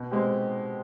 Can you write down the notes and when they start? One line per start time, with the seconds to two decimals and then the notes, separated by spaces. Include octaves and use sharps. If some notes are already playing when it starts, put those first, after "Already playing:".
Already playing: B2
0.11 G#3 C4 G4